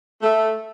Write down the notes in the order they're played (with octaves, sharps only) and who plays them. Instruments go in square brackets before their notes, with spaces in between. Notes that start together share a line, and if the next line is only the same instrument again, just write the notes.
[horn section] A3